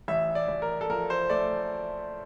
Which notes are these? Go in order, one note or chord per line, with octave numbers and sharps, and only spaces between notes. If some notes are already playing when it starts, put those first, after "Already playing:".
A1 E5
D5
A1
A#4
A4
F3 A#4
C5
A3 D5